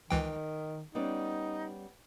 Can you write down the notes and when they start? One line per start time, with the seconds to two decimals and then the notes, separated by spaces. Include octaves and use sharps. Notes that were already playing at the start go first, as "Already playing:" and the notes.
0.11 C#2 D#3 E3 G5
0.95 G3 B3 C#4 D#4